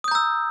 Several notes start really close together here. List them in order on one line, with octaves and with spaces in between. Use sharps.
D#6 G6 A#5 E6